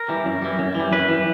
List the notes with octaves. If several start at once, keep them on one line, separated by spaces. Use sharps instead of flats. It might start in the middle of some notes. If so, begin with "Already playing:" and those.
Already playing: A#4
E3 G3
F#2
E3 G3
F#2
E3 G3
F#2 B4
E3 G3